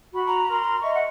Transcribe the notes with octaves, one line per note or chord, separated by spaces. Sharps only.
F#4 B5
A#5
A#4 C6
A#5
D#5 E5 C#6
F#5